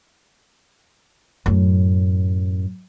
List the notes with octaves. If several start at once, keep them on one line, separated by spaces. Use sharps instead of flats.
F#2 A2